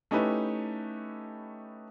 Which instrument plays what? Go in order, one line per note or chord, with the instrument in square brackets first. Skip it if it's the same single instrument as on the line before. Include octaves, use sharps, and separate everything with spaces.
[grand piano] A3 C#4 D#4 E4 G4 B4